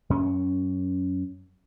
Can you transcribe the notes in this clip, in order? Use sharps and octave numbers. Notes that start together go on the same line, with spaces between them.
F#2 C#4